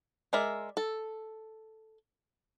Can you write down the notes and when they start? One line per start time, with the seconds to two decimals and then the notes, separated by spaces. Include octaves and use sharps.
0.33 G#3 A#4 D5 E5
0.77 A4